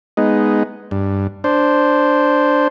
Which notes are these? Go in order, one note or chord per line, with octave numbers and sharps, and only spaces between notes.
G#3 B3 D#4
G2
D4 C5